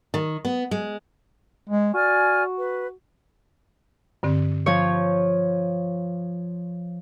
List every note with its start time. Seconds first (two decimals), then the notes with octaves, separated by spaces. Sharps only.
0.14 D#3
0.45 B3
0.71 G#3
1.69 G#3
1.94 F#4 D5 G#5 F6
2.58 B4
4.23 G2 D3 C4
4.66 F3 C#5